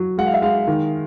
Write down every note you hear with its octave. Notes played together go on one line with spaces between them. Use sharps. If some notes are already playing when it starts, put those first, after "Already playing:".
Already playing: F#3
G#3 F#5
F5
E5
G#3 F5
D#3